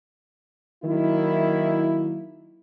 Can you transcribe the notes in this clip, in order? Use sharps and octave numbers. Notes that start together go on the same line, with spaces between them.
D#3 F#3 A#3 E4